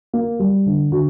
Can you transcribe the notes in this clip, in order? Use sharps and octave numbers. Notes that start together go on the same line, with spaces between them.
A#3
G3
D3
D3 F#4